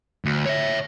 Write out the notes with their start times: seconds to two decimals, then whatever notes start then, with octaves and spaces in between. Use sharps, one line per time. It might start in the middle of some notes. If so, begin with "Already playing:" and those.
0.25 D2
0.46 C#5 E5